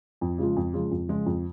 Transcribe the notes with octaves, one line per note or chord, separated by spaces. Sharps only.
F2
C#3 F3 G#3 F4
F2
C#3 F3 G#3 F4
F2
C#3 F3 G#3 F4
F2